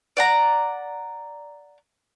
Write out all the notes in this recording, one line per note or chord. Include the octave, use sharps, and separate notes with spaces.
D5 F#5 A#5